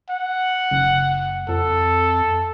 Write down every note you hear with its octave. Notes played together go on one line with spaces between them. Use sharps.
F#5
F#1
F2 A4